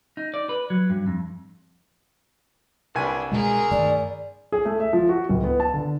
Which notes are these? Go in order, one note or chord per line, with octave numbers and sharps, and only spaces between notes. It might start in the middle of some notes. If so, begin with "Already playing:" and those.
D#4
D5
B4
F#3
G2
F2
C2 D4 B4 G#5
B2 G#3 G#4 A#4
G2 D#3 A3 D5
G#4
A3
E5
F3
F#4
D1
B3
A5
D3